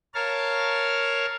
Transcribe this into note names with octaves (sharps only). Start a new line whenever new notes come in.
A#4 C#5 F5 A5 F6